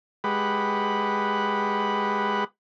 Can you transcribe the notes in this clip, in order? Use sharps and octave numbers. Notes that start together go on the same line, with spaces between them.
G#3 G4 B4 F#5 B5